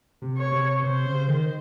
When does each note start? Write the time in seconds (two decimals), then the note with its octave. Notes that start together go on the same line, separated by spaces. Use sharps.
0.22 C3
0.37 C#5
0.52 C3
0.82 C3 C5
1.05 C#3
1.28 D#3